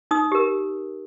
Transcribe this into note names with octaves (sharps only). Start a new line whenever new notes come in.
D#4 D#6
G4 A#4